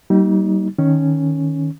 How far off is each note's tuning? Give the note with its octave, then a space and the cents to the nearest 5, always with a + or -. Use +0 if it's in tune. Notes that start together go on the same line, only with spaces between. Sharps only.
G3 -35 A#3 +0 D#4 +20
D#3 +0 C#4 +0